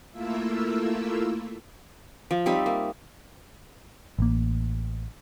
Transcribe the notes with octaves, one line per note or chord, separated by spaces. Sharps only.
A3 A#3 E4 F4 E5
F3
G3 C4 D#4 E5
A#3
A1 A#3